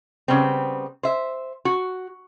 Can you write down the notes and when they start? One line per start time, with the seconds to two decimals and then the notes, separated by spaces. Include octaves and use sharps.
0.28 C#3 G3 B3 C4
1.03 C5 E5
1.65 F#4